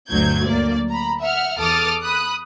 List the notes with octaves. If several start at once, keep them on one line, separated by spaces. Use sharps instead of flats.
G1 D2 F#3 G6 G#6
D2 F#3 A#3 D5
A#5 B5
E5 F#5 F6
E2 A4 D6 D#6 F6 A6
B5 D#6 F#6